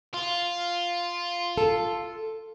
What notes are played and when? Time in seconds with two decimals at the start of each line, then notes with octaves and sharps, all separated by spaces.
0.14 F4
1.58 A4